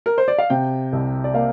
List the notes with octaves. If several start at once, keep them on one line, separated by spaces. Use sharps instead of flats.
A#4
C5
D5
F5
C3 G5
C2
D5
A#3 F5